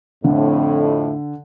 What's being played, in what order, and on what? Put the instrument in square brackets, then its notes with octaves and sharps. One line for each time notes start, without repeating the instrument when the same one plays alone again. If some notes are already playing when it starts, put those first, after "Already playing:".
[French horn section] F2 A2 [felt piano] D3